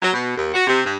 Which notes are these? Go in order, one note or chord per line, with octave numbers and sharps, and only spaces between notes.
F#3
B2
D#2
F#4
C3
G2